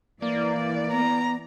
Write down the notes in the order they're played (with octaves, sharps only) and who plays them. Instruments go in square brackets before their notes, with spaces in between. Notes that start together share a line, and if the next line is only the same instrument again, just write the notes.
[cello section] E3 D5 [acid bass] A#3
[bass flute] B3 [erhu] A#5